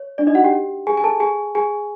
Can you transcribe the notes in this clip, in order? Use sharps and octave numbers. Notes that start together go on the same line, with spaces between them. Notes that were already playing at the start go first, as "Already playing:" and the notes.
Already playing: C#5
D4 D5
D#4 D#5
F#4 F#5
G4 G5
G#4 G#5
G#5
A4 A5
G#4 G#5
G#4 G#5